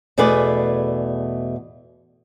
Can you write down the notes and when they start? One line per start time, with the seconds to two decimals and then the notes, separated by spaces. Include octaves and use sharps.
0.18 E2 B2 A3 G#4 B4 D5